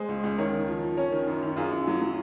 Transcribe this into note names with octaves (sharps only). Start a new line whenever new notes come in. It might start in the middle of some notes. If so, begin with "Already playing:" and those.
Already playing: G#3 G#4 C5
C#2
C#2
D#3 A#4 C#5
D#3
F3
F3
C#4 A#4 C#5
D#3
F#2
D#3
F#2 F4 G#4
F#2
F#3
F#3